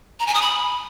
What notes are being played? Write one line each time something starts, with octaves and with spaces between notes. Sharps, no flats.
A#5
G#5
D#6
B5